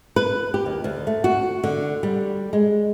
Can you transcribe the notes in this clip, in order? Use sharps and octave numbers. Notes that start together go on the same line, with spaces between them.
B4
G4
D#2
D2
A3
F#4
D3
G3
G#3